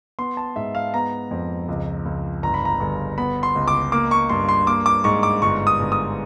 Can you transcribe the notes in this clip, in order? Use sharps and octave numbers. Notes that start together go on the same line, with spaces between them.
B3 C6
A5
G#2 E5
F5
B3 A#5
F2
C#2
C#2
G1 A#5
B5
A#5
G1
B3 B5
C6
C#2
D6
A#3 D6
C#6
G2 C6
C6
A#3 D6
D6
G#2 C#6
D6
G1 C#6
D#6
G1
D#6